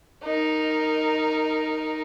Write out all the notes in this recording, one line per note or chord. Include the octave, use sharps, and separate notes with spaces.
D#4 A#4